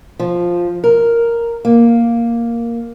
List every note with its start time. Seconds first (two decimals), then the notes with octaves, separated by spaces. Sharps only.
0.19 F3
0.84 A#4
1.65 A#3